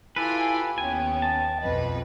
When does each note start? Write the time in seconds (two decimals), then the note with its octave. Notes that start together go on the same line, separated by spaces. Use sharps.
0.16 E4 F4 G4 A4 B4 G#5
0.78 D#2 B3 C#4 G5 G#5
1.22 A5
1.61 B1 F2 B4 D#5